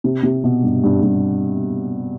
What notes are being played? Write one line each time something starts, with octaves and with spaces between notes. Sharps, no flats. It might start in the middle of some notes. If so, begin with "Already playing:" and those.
C3
C3
B2
G2
G2
G2